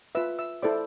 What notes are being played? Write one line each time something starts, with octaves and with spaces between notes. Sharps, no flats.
F4 B4 E5 E6
E5 E6
E4 A4 C5 D5 D6